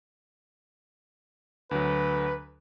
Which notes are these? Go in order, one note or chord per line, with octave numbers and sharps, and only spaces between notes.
D2 F#3 B4